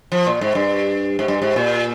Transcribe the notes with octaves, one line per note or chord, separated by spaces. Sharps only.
F3
A#2
G#2
G2
G#2
G2
G#2
A#2